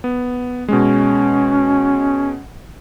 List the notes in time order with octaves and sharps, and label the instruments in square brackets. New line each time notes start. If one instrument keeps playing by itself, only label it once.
[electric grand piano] B3
[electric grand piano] B2 G#3 [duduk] C#4